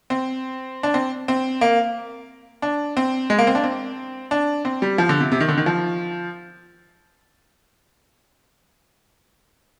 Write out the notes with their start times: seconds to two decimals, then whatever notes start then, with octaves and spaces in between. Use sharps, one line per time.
0.10 C4
0.83 D4
0.94 C4
1.28 C4
1.61 A#3
2.62 D4
2.97 C4
3.30 G#3
3.39 A#3
3.47 C4
3.55 D4
3.64 C4
4.31 D4
4.65 C4
4.82 G3
4.98 F3
5.09 D3
5.20 C3
5.32 C3
5.40 D#3
5.49 D3
5.58 D#3
5.66 F3